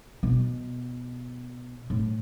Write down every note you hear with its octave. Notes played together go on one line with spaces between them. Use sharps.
B2
A2